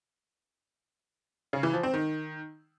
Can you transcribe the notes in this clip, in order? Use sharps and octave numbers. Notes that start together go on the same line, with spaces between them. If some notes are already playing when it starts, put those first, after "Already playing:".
C#3
E3
F3
C4
D#3